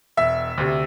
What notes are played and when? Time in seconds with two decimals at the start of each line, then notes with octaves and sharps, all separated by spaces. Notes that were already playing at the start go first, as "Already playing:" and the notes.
0.17 E1 E5
0.58 D2 C3